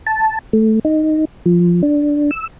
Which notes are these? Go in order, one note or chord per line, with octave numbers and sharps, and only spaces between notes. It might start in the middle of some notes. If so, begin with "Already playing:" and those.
A5
A3
D#4
F3
D4
E6